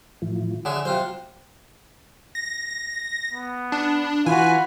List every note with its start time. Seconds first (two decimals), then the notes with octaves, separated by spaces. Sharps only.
0.22 A2 E3 F3
0.65 D3 G#4 C#5 D5 E5 F#5
0.85 C3 F#3 F4 C5 F#5
2.35 A#6
3.33 B3
3.72 D4
4.26 E3 F4 F#4 B4 G#5